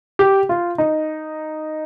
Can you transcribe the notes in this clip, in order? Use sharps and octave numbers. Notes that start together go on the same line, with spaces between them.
G4
F4
D#4